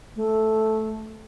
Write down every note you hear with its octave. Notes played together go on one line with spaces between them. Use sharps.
A3